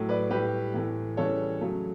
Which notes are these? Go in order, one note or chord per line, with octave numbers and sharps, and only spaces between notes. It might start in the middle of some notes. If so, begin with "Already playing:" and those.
Already playing: A2 F#3 A3
B4 D5
A2 G3 G4 B4
A2 E3 A3
C#3 E3 G3 A4 C#5
C#3 F#3 A3